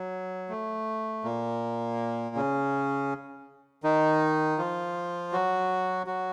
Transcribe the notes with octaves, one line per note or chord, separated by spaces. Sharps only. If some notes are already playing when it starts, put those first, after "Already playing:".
Already playing: F#3
A3
A#2 A#3
C#3 C#4
D#3 D#4
F3 F4
F#3 F#4
F#3 F#4